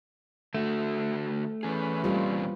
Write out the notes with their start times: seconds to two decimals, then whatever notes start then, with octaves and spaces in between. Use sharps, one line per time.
0.55 D3 A3 F#4
1.63 E3 C#4 G#4 B4
2.04 E2 A#2 G3 C4 F4